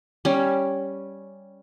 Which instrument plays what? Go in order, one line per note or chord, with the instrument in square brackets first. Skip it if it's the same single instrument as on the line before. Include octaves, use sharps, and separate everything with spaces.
[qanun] G3 C#4